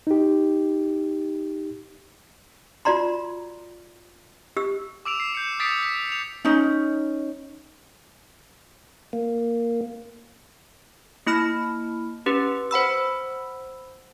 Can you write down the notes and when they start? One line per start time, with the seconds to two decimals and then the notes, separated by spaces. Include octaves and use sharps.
0.07 D#4 G4
2.85 F4 F#4 D5 A#5 C6
4.57 G4 E6
5.05 D6 E6 D7 F7
5.20 C7
5.35 G6 C#7
5.60 D#6 A6 B6 C7 D7
5.82 B6
6.08 C#7 F7
6.45 C#4 D#4
9.13 A#3
11.27 A#3 E4 B5 F6
12.26 C#4 G4 B4
12.71 C5 F#5 B5 E6